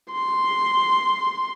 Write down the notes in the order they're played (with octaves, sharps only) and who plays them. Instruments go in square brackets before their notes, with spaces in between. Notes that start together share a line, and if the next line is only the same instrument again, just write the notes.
[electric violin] C6